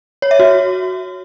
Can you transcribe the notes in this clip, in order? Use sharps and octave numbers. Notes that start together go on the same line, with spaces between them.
C#5
E5
F#4